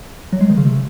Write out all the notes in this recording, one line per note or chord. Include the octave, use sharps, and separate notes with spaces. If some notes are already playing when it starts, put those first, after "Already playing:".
F#3
G#3
D#3
C#3
C3